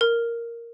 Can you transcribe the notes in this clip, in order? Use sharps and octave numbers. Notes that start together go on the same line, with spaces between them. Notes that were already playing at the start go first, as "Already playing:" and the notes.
A#4